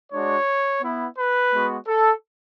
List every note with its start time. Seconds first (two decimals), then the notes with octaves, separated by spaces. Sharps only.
0.12 G#3 D4 F#4 C#5
0.82 B3 E4
1.17 B4
1.52 G#3 B3 F#4
1.87 A4